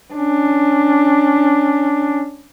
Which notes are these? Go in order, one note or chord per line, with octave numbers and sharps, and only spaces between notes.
C#4 D4